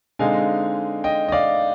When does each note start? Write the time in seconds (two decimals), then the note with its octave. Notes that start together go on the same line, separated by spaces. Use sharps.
0.19 D3 G#3 C4 D#4 F5 G#5
1.04 D#5 G5
1.28 D#5
1.32 D5 F5